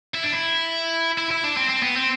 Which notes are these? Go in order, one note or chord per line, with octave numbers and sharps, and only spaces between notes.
E4
D4
E4
E4
E4
D4
C4
C4
B3
C4